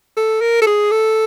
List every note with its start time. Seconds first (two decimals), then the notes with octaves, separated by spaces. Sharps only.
0.17 A4
0.41 A#4
0.62 A4
0.66 G#4
0.92 A4